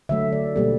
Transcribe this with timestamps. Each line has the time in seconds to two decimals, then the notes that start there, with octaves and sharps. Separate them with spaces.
0.09 D3 F#3 A3 E5
0.32 D5
0.56 B2 G3 A#3 A4